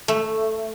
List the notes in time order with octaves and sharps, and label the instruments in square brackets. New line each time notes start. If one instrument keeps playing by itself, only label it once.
[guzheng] A3